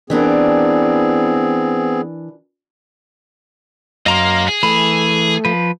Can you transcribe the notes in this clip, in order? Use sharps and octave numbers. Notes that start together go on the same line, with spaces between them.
E3 B3 C4 D4 G#4 A#4
F#2 A#3 D#5 F5 A#5 C6
G#4
E3 A3 B5
F3 B4